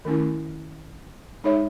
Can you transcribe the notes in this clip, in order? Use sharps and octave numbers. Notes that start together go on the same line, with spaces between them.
D#3 A3 C#4 E4
G#3 D#4 G#4 C#5 E5